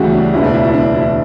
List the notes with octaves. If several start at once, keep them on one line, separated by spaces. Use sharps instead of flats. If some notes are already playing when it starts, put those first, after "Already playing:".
Already playing: D2 C#3 E3 G3 F#4 G4
D4
E1 D2 C#3 E4
D4
E4
E4
D4
E4